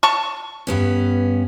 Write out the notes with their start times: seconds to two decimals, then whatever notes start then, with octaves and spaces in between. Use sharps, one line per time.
0.03 A5 C#6
0.67 G2 B3 C#4